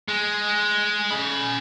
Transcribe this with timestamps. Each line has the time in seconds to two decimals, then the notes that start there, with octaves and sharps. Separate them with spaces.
0.08 G#3
1.11 C#4 B5